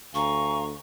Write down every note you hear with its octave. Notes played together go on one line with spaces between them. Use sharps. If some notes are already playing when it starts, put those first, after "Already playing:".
D2 F5 G#5 A#5 C#6